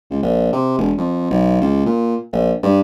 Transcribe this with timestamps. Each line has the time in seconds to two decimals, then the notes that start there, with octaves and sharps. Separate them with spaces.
0.10 C#2
0.23 A#1
0.53 C3
0.78 E1
0.97 F2
1.31 B1
1.61 C#2
1.86 A#2
2.32 A#1
2.63 G2